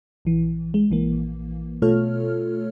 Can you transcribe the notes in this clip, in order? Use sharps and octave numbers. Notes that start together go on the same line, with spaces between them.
A#1 E3
G#3
A#1 E3 A#3
B2 A3 F4 A4 C#5 F6